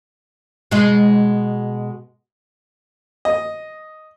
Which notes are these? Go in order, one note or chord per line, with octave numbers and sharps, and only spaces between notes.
B2 G#3
D#5